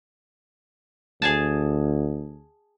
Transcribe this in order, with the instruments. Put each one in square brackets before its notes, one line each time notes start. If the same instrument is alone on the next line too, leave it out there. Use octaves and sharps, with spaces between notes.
[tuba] D2 [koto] G#4 G#5 A5